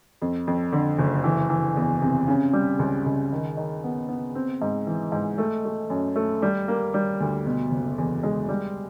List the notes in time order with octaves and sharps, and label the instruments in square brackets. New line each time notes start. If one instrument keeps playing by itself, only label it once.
[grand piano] F2
F2
D3
F#1
E3
E3
E2
C3
C#3
G3
C#2
C#2
D#3
D#3
B3
B3
C4
G#2
E3
G#2
A3
A3
F#2
A3
G3
A#3
G3
D2
B2
F#1
E2
G#3
G3